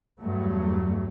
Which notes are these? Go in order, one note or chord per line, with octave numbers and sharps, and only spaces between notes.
E2 G2 F#3 A3